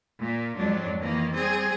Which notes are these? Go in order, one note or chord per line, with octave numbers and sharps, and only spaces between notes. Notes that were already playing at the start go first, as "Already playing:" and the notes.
A#2
F2 G#2 F#3 D4
D#3 E3 A#3
G3 C4 G#4